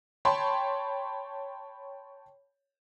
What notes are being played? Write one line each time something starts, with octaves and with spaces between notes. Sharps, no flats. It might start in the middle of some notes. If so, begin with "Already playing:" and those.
C#5 G5 A5 B5 C6